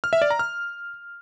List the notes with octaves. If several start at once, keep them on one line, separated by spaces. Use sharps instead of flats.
F6
E5
D5
A#5
F6